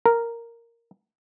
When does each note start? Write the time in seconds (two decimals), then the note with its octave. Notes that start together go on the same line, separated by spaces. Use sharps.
0.06 A#4